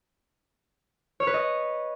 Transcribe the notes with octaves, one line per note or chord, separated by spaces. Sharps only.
C#5
B4
D#5